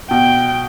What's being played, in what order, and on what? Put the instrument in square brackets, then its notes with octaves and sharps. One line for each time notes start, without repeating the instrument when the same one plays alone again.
[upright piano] B2 [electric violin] G5